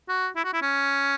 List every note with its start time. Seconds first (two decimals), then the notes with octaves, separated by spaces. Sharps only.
0.09 F#4
0.36 E4
0.45 F#4
0.54 E4
0.62 C#4